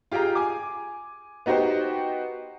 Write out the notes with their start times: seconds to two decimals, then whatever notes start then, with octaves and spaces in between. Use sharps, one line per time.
0.12 F4 G4 G#4 G5 A#5
0.35 G#5 D6
1.46 B3 D#4 F#4 G4 C5